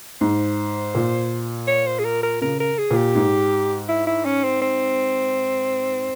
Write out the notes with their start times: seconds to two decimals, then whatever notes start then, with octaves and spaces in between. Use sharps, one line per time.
0.21 G#2 C5
0.95 A#2
1.68 C#5
1.87 C5
1.99 G#4
2.05 A#4
2.23 A#4
2.41 C#3 A#4
2.60 A#4
2.78 G#4
2.91 A#2
2.96 G4
3.15 G#2
3.89 E4
4.07 E4
4.25 C#4
4.44 C4
4.62 C4